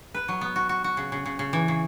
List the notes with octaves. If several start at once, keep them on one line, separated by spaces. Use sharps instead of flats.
B4
F#3
B3
F#4
F#4
F#4
C#3
C#3
C#3
C#3
E3
C#3